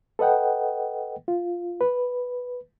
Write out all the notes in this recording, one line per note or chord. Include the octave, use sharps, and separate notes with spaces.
A4 B4 D#5 F#5 G5
F4
B4